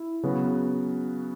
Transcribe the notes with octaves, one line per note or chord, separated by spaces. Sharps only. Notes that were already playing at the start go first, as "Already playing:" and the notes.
Already playing: E4
C#3 F#3 B3 F#4 B4